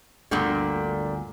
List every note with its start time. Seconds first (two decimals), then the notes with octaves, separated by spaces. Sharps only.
0.31 G1 D2 A#2 D3 G3